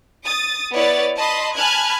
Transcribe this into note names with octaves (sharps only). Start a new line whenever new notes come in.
D#6 A6
B3 E4 B4 C#5 D5 A6
D#5 A5 B5 C6
G#5 A5 B5 F6 F#6 G#6